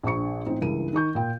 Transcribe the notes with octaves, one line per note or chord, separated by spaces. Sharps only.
A#1 D4 C5 C#6 C#7
A1 C4 D#4
C#2 G2 E3 A#4 D#7
D#3 D#4 C#6 G6
A#2 G5